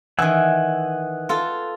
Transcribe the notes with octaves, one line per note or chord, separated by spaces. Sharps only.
D#3 E3 F#5 G#5 E6
F4 A4